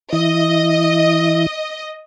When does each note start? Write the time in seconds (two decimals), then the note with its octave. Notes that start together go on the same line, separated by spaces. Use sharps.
0.13 E3 E4 D#5